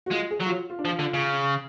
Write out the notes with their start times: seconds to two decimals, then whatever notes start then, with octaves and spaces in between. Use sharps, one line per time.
0.06 F#4
0.11 G#3 F4
0.31 G#4
0.40 F#3
0.46 F4
0.50 F#4
0.70 F4
0.79 D4
0.85 F3
0.88 F4
0.99 D3
1.14 C#3